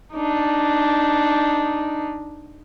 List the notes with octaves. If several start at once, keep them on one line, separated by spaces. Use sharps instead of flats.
D4 D#4